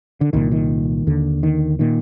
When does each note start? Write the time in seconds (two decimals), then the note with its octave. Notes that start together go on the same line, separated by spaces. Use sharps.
0.21 D3
0.33 C2 A#2 D#3
0.52 D#3
1.07 D#2 D3
1.43 D#3
1.79 A#2 D#3